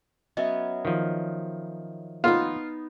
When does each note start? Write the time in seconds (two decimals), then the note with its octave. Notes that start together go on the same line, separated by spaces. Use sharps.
0.37 F#3 B3 C#4 D#5 E5
0.85 D#3 F3
2.24 B3 D#4 F4